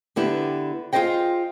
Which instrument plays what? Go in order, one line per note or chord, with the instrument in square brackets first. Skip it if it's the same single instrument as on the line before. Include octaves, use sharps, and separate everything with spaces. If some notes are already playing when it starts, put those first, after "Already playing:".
[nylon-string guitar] D3 B3 E4 G4
F4 F#4 G#4 C5 D#5 G5